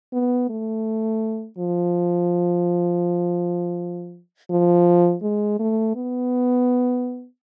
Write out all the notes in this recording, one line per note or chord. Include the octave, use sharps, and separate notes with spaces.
B3
A3
F3
F3
G#3
A3
B3